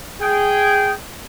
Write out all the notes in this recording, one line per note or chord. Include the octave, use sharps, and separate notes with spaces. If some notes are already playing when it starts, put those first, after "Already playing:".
G#4 G5